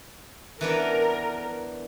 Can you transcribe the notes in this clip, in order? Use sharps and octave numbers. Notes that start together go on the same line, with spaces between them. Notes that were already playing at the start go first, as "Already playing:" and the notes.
E3 B3 D4 A#4